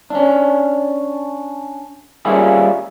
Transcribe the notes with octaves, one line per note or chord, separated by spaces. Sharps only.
C#4 D4
G3 A#3 C#4 E4 F4 G#4